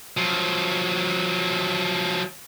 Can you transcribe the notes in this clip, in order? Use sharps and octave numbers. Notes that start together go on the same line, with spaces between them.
F3 F#3